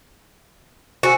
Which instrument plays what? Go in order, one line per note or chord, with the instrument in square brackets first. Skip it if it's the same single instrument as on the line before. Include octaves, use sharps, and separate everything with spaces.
[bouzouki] F#4 [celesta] C5 G#5 E6